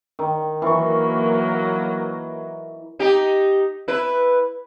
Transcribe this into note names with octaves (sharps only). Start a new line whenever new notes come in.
D#3
E3 F#3 A#3 C#6
D#4 G4
E4 B4